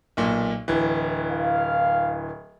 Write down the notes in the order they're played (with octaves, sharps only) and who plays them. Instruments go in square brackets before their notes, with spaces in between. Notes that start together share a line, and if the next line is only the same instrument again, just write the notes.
[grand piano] B1 A#2
D1 E3
[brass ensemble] F5